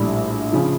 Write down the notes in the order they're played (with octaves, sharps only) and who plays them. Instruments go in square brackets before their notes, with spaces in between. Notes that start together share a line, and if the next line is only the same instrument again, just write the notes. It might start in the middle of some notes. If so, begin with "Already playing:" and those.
Already playing: [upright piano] A#1 A2 G3
C#3 F3